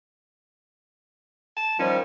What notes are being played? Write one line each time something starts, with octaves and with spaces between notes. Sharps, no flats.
A5
D#3 F3 G3 C#4